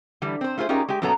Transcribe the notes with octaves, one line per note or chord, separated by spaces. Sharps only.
D3 E3 G3
C4 C5
A3 F4 G#4 B4 C5
C#4 D#4 F4 G4 G#4 A#4
G#3 G4
F#2 A#2 F#3 B3 A4 A#5